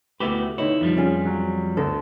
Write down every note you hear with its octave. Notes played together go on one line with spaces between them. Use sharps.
D2 A3 B3 E4 F#4 G4 B4 D6
D3 D#4 E4 C#5
F2 F3 G3
C#4 F4 G#4
F#3
D2 A4